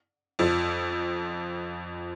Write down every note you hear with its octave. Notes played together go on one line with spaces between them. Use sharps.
F2 F3